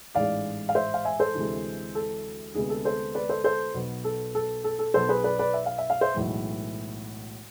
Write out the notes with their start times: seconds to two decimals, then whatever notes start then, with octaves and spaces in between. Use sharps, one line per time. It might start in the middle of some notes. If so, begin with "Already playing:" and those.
0.15 A1 G#2 G#3 D5 F5
0.69 F5
0.75 C5 E5
0.94 F5
1.05 E5 G#5
1.19 A4 C5
1.35 D2 C3 E3 G#3
1.95 A4
2.54 D2 C3 G#3 B3 G#4
2.70 A4
2.85 A4 C5
3.14 B4 D5
3.29 A4 C5
3.44 A4 C5
3.74 B1 B2 B3
4.04 A4
4.35 A4
4.64 A4
4.79 A4
4.94 B1 B2 B3 A4 C5
5.09 G#4 B4
5.24 B4 D5
5.39 B4 D5
5.54 E5
5.66 F5
5.78 E5
5.90 F5
6.01 C5 E5
6.14 B1 A2 E3 G#3